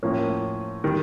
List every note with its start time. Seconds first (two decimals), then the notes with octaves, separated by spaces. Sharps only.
0.03 A2 F3 A#3 C#4
0.84 D#3 G3